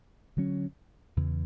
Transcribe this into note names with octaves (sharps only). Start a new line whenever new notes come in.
D3 F#3 C#4
E2 C#3 E3